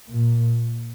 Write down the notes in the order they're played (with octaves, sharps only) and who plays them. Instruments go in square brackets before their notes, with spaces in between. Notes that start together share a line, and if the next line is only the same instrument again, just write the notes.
[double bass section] A#2